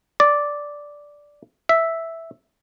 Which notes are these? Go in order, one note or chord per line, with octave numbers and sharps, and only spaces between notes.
D5
E5